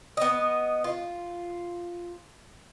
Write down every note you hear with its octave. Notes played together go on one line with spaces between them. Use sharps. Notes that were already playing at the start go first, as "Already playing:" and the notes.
B3 D#5
F4